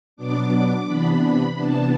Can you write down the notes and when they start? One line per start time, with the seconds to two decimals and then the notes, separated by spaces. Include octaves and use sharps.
0.17 B2 F#3 B3 D4 D6
0.86 C3 E3 B3 D4 B5
1.21 B5
1.56 C3 E3 B3 D4 A5